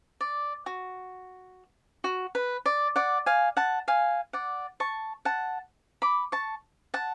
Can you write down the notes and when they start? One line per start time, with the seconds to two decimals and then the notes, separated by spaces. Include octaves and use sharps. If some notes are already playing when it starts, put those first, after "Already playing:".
0.21 D5
0.66 F#4
2.04 F#4
2.35 B4
2.66 D5
2.96 D5 F#5
3.26 F5 G#5
3.57 F#5 A5
3.88 F5 G#5
4.33 D5 F#5
4.80 A5 C#6
5.25 F#5 A5
6.02 B5 D6
6.32 A5 C#6
6.94 F#5 A5